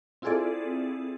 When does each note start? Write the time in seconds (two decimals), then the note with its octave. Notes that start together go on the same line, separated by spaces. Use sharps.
0.22 C4 E4 F4 G#4 A4 D5